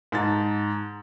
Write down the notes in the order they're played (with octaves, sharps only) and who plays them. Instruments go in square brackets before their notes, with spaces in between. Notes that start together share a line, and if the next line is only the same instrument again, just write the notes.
[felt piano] G#2 A5 A#5 A6